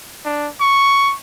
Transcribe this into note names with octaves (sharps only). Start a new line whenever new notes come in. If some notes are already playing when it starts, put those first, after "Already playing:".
D4
C#6